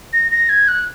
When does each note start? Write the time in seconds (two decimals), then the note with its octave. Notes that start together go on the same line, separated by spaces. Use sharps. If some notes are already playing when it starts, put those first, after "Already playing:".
0.13 A#6
0.32 A#6
0.49 G#6
0.68 F#6